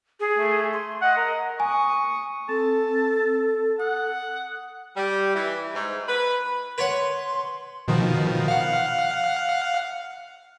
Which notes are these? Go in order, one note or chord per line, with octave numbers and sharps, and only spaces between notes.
G#4
A3
C6
D#5 F#5
A#4
G#5 C#6 D#6
C4 A4 A5
F#5 D#6
G3
E3
G#2
B4
B4 C#5 F#5 C6
B2 D#3 F3
F5 F#5